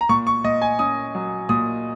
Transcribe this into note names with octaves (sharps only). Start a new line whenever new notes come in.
A#5
A#2 C#6
C#6
A#2 D#5
G#5
C#4 D#6
F#3
A#2 D#6